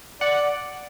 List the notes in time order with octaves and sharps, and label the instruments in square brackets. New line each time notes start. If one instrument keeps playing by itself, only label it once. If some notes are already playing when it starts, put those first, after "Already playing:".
[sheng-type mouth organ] D5 [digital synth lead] F#5